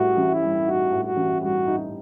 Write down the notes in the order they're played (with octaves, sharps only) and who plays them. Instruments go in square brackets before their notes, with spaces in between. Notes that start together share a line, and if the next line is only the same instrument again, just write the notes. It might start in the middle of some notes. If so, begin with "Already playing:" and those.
Already playing: [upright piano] A2 G3 [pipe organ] F#4
[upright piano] A1
[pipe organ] E4
[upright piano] G3
[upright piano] D#4 [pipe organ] F#4
[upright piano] A2
[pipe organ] F#4
[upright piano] A1
[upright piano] G3 [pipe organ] F#4
[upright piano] D#4